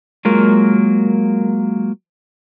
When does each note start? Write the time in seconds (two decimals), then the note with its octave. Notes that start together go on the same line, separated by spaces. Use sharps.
0.25 F#3 G#3 A#3 F4 A#4